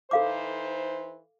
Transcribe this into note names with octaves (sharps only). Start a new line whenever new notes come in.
E3 D#4 A4 C5 F5 D6